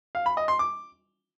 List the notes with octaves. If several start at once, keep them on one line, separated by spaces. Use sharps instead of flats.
F5
B5
D#5
C6
D6